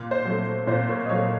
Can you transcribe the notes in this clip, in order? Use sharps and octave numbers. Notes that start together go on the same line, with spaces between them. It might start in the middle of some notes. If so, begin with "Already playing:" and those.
Already playing: A#2
C5
F#3 A3
A#2 C5
A#4 C#5
D#5
F#3 A3 C#5 F5